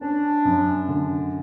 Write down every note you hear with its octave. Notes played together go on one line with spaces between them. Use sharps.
C#4 D4
F#2
D3